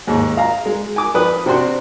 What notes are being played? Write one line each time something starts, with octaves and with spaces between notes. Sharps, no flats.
D#2 G#2
F5 A#5
G#3
G#5 D6
F3 B4 D#6
C3 C4 D4 F#4 C6